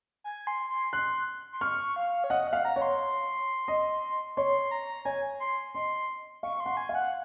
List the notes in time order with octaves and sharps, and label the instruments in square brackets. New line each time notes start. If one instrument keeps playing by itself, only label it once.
[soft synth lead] G#5
C6
C6
[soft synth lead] C6 [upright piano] F#6
[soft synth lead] C6
[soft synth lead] C#6 [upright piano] F6
[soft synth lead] F5
C#5
[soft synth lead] D#5 [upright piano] F#5
[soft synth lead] F#5
[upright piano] F5
[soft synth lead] A#5
[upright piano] C#5
[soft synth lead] C6
[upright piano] D#5
[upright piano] C#5 [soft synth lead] C6
[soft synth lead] A#5
[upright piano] C#5 [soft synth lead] G#5
[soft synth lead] C6
[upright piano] D#5 [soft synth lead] C6
[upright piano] F5 [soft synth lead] C#6
[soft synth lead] C6
[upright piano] F#5
[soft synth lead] G#5
[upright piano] F5
[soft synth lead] F#5